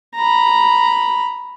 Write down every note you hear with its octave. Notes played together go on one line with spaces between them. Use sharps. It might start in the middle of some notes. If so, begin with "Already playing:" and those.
A#5 B5